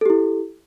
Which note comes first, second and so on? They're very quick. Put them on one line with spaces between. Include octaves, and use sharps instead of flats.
A4 G4 E4